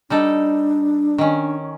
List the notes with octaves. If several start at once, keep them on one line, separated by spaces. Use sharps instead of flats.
G3 D4 D#4 A4
D#3 C#4